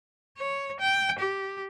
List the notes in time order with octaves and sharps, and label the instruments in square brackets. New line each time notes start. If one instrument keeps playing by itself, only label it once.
[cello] C#5
G5
G4